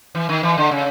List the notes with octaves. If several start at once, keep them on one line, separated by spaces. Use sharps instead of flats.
E3
D#3
E3
D3
C#3